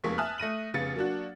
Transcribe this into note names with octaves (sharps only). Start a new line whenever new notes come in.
F1 F2 G#3 A#3 C#6 B6
E5 G#5 A5 D#6 F6 F#6
A3 A#6 D#7 F#7
F1 C#3 B3 A6 C#7
F#3 A#3 D4 F#4